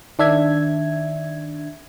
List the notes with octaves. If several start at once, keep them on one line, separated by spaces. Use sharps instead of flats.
D#3 D4 E5 G#6